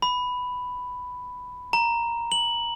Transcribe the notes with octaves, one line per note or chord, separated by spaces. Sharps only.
B5
A#5
F#7